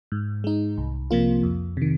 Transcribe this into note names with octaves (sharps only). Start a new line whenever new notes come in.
G#2
G#3 D#4
C2
C3 F3 A#3 F4
F2
C3 D#3